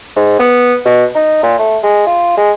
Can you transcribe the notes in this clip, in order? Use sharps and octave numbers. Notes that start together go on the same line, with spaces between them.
G#2
B3
B2
D#4
A#2
A3
G#3
F4
G#3